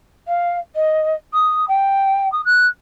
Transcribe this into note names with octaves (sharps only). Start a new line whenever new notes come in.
F5
D#5
D#6
G5
D#6
F#6